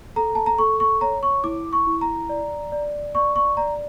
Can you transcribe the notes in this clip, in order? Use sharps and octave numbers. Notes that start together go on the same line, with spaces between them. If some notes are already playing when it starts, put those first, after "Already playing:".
A4 A#5
A5
A#5
A4 C#6
C#6
C#5 A#5
C#6
E4 D6
C#6
E4
A#5
D5
D5
D5 C#6
C#6
D5 A#5